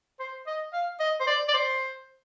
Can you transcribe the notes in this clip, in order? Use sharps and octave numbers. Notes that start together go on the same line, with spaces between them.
C5
D#5
F5
D#5
C5
D5
D5
C5